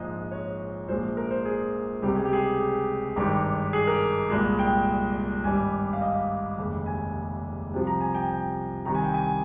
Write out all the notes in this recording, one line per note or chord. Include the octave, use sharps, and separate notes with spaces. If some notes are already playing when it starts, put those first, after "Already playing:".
Already playing: A#1 G#2 F3 G#3 D#5
C#5
A#1 A#2 F3 G#3 C5
A#4
C5
G#4
C#2 C3 G3 G4
G#4
G4
G#4
G#4
G#1 G2 D#3 G#3 G4
G#4
A#4
C2 A#2 G#3
G5
G#1 G2 G3 G#5
F5
D#5
F1 D#2 C#3 G#3
G#5
C2 C3 F3
A#5
G#5
G5
G5
C2 C3 D#3 A#5
G#5
G5
G#5